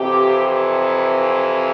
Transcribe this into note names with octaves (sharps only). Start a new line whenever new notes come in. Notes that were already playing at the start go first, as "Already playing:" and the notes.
Already playing: F2 C3 E3 G4